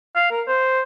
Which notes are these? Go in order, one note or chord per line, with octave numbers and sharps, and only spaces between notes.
F5
A#4
C5